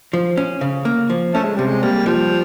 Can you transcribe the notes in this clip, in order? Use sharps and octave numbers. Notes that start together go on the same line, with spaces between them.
F3
C#4
C#3
A#3
F3
A3 C#4
G#3
C3 G3
G#3
G3 A#3
F3 G3